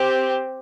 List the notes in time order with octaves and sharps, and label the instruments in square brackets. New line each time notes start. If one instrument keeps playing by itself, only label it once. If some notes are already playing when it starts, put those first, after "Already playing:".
Already playing: [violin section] C4 G4